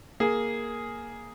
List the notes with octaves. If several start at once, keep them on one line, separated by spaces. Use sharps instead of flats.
A#3 G#4